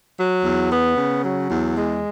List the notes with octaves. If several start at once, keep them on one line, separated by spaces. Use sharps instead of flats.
F#3
E2
B3
C#3
F#3
E2
G#3